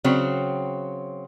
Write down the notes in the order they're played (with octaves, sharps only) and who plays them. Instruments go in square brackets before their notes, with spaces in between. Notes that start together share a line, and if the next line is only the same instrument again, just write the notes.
[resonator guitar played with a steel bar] C#3 F#3 C4